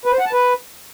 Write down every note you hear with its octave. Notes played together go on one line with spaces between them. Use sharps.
B4
C5
F#5
A5
B4